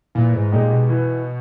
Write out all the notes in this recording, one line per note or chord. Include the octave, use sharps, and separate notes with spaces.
A#2 E3
G#2
A#2 G#3 D#4 G4
B2
E3